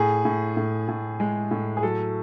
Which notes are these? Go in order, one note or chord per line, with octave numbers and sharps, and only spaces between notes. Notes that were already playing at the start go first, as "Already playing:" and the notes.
Already playing: A2 G#4
A2
A2
A2
G#3
A2
G#4
F#3 A4